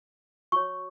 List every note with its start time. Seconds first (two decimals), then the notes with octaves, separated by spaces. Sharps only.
0.52 F#4 C#5 C#6